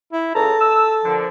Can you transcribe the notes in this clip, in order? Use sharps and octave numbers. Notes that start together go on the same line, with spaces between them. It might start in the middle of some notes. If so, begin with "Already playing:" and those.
E4
C#2 A4 A#5
E6
A#2 D3 F3